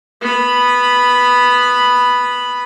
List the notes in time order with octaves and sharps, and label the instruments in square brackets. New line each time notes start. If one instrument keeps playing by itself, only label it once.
[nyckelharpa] B3 B5